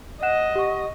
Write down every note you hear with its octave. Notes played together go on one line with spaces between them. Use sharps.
D#5 F#5 F#6 E7
G4 F#5 C#6